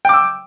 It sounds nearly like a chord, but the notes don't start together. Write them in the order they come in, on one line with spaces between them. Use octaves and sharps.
G5 D6 E6